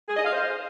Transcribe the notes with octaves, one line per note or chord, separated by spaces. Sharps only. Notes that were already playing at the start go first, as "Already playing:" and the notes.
G#4
D#5
F5
C5